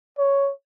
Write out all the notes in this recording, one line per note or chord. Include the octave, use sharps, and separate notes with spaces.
C#5